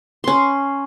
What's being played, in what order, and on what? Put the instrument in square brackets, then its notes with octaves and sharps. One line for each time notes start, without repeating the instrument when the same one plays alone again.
[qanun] C#4 C6